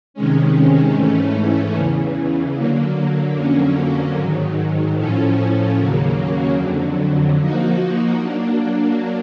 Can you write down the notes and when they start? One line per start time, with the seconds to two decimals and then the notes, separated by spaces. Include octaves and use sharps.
0.14 C3 D#3 G#3 C#4
0.94 G#2 E3 A3 C#4
1.75 E2 C#3 E3
2.55 D3 F#3 A#3
3.36 F2 D3 F#3 A#3 C#4
4.16 G#2 D#3 F#3
4.97 A2 F3 A3 C#4
5.77 D#2 C#3 F#3 A#3
6.57 F2 D3 F#3
7.38 F3 A#3 D#4 F#4
8.18 F#3 A#3 D4